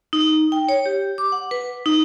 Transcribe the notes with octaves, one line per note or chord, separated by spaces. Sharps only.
D#4
G5
C#5
G4
D6
F#5
B4
D#4